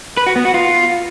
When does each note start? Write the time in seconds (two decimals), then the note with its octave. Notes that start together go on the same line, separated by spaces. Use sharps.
0.17 B4
0.27 F#4
0.36 B3
0.45 F#4
0.54 F4